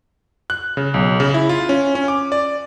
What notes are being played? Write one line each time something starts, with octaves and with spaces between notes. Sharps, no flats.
F#6
C#3
B1
C#3
E4
F4
C#4
C#4
D6
D5